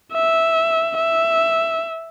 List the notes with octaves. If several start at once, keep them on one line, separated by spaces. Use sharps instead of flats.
E5
E5